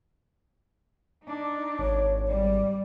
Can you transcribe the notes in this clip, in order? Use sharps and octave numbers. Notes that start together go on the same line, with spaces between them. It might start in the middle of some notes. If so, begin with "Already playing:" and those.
D4 D#4
G#1 C#5
G3 D5